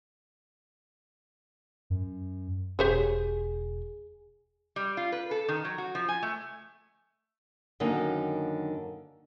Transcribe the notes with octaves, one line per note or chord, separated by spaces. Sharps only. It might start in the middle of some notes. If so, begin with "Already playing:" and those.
F#2
E1 G4 G#4 C5 C#5
G3
F4
B4
A4
D#3
F#3
F#4
F3
G#5
A3
F#2 D3 D#3 A#3 D#4